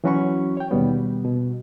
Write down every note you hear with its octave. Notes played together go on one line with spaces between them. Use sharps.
E3 F#3 C#4 F#4 B5 C#6
C#5 G5
D#2 B2 G3 B3
B2